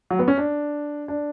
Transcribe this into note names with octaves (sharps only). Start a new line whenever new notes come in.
F#3
B3
C#4
D4
D4